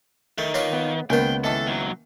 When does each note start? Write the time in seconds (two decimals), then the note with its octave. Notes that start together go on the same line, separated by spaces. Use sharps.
0.38 D#3 A3
0.54 A#3 F4 B4 C#5
0.73 B3
1.10 C#2 D#3 A#3 B3 A#4 C5 G5
1.44 D#3 E3 A4 D#5 A5
1.67 D#2 F#3